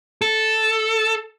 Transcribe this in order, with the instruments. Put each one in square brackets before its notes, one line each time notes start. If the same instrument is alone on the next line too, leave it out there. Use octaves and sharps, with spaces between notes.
[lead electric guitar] A4